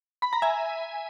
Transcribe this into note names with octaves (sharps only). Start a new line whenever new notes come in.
B5
A#5
E5 G#5